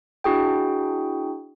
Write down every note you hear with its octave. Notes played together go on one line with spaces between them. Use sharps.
D4 E4 F#4 G#4 G5